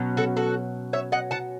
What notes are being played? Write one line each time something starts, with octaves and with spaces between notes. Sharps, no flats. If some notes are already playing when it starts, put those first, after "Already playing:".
Already playing: B2 F#3 C#4
F#4 A4
F#4 A4
C#5 E5
D#5 F#5
F#5 A5